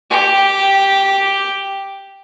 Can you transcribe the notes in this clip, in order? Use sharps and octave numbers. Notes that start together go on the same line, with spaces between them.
G4